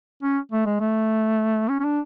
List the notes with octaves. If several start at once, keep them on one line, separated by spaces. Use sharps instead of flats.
C#4
A3
G#3
A3
C#4
C#4
D4